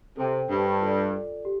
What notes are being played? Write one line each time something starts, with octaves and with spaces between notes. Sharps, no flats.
C3 A4 C5 G5
G2
F4 A4 D5
G4